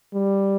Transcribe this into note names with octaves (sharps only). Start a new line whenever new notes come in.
G3